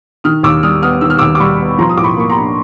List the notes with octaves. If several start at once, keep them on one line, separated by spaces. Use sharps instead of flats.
D#3 D#6 F6
D#2 D6 E6
G3 D#6 F6
B3 D#6 F6
D#3 E6
F6
D#2 D6 E6
D6
G3 B5 C#6
B3
F3 A#5 C6
D#6
A2 D6
B5 C#6
A#3 C#6
A#5 C6
D4